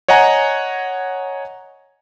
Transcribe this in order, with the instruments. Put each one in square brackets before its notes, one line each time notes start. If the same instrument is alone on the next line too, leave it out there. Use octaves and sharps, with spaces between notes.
[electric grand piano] C#5 D#5 F#5 G#5 A#5